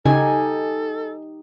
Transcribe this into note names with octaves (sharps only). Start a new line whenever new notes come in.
C#3 D#4 G4 A4 G#5